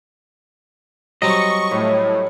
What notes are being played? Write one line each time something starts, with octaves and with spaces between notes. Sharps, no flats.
F#3 G3 C4 D#5 C#6
A2 C#5 B5 C#6